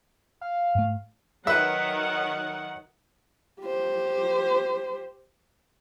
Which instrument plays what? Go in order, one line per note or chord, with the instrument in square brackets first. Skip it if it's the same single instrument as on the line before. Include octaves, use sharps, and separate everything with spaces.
[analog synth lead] F5
[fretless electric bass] G#2 A3
[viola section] D#3 F#3 F#5 [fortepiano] B4 E5
[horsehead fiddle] G4 C5